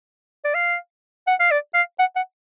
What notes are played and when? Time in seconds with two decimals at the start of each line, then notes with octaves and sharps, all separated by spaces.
0.45 D5
0.54 F5
1.27 F#5
1.40 F5
1.51 D5
1.74 F5
1.99 F#5
2.16 F#5